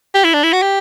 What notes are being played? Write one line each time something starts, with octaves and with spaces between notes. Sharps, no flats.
G4
E4
D4
E4
F#4
G4